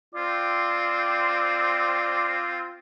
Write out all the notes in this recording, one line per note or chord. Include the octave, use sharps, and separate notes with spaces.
C4 F4 D5